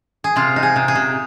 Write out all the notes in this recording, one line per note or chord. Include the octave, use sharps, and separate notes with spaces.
G#4
C3 F4
D#4
G#4
C3
G#4
C3